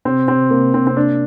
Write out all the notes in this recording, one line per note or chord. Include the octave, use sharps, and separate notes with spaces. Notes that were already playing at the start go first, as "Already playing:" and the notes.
C3 C4
C3 C4
C3 A#3
C3 C4
C4
A#3 D4